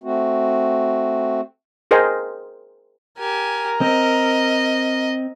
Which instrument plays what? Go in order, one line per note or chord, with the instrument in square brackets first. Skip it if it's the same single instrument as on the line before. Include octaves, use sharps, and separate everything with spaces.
[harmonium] A3 C4 F#4
[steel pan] G#4 A#4 C5 D#5 G5 G#5
[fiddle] G4 G#5 [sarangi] A#4
[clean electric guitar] C4 [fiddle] D#5